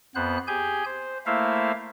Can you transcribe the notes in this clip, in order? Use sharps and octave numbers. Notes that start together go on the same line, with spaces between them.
F2 B3 C5 F#6
G4 G#4 G#5 G6
C5
A3 A#3 E4 C5 E5 F5